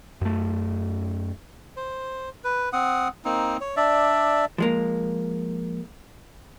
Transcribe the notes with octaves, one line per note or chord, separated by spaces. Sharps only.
F#2 A3
C5
B4
C4 F#5 D#6
A#3 C4 D#4
C#5
D4 D5 E5
F3 G#3 A#3